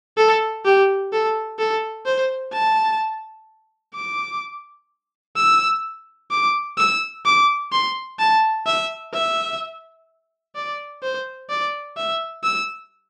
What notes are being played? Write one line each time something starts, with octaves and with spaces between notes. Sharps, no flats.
A4
G4
A4
A4
C5
A5
D6
E6
D6
E6
D6
C6
A5
E5
E5
D5
C5
D5
E5
E6